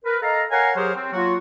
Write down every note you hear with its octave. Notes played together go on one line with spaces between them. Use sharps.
A#4 B4
A4 D#5 F5 A#5
A#4 C#5 F5 F#5 G#5 A#5
F#3 G4 G#4 A#4 C5 C#5
C4
F#3 A#3 F4 F#4